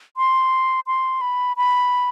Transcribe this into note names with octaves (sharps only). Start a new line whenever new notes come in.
C6
C6
B5
B5